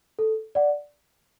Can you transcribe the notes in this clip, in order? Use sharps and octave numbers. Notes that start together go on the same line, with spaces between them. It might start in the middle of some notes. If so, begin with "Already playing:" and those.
A4
D5 F#5